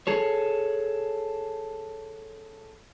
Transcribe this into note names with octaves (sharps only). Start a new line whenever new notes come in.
G#4 A4 C#5